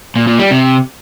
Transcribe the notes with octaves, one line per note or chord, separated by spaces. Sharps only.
A#2
A#2
G3
C3